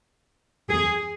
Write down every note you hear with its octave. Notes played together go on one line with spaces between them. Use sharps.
G#4